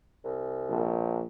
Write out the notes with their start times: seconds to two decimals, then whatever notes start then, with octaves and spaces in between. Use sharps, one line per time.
0.24 C2
0.69 A#1